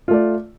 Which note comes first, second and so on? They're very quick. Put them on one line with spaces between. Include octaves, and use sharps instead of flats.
F4 A3 D5